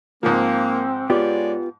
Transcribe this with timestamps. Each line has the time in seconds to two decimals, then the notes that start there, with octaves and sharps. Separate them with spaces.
0.23 G#2 F3 A#3 C4
1.10 G#3 B3 F4 G4 C#5 D5